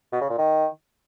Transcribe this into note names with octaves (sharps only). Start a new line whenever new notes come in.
B2
C#3
A#2
D#3